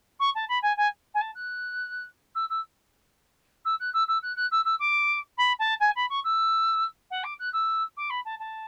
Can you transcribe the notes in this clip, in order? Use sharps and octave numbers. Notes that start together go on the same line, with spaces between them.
C#6
A5
B5
G#5
G#5
G#5
A5
F#6
E6
E6
E6
F#6
E6
E6
F#6
F#6
E6
E6
D6
B5
A5
G#5
B5
C#6
E6
F#5
D6
F#6
E6
D6
B5
A5
A5